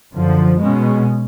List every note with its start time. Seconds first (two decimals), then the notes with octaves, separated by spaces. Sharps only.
0.14 F#2 D3 F3
0.58 B2 G#3 C#4